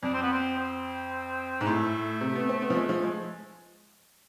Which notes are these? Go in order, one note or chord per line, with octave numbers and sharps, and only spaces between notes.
F2 D4
C4
B3
C4
C4
G#2
A2 A3
C3
B3
C4
B3
F3
G#3
F3
G#3